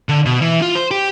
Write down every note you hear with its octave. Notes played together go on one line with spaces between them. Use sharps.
D3
B2
E3
F4
C5
G4